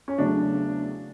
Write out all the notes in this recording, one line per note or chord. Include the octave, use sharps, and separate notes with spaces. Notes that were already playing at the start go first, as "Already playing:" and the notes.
C#4
E2 C#3 F#3 A3 D4